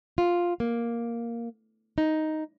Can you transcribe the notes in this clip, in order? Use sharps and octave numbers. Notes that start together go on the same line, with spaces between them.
F4
A#3
D#4